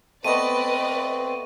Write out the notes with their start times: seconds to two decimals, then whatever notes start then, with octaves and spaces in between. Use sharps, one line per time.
0.24 A3 B3 C4 B4 D5 D#5 C#6 D#7